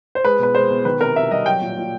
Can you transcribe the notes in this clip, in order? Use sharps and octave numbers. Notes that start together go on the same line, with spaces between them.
C5
G#3 B4
B2 B4
G#3 C5
B2
D#3 B4
C3 A#4
C3 E5
G3 D#5
F#3 G5
A#2
A#2